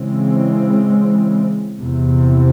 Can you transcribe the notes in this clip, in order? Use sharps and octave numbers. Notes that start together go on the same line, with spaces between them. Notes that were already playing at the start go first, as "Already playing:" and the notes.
Already playing: C#3 E3 G#3 C4
E2 C3 E3